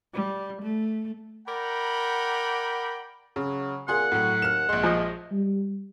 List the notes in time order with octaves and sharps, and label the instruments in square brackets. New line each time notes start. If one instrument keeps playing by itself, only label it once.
[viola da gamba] G3
A3
[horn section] A#4 D5 F#5 G5 A#5 B5
[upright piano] C#3 [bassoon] F#3
[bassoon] A#2 [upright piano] G#4 C6 [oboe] F#5
[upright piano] A2 F#3 [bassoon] F#4
[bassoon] D#2 [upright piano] F6 E7
[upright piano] A#1 C6 [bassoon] G#3
[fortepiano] F3 D#5
[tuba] G3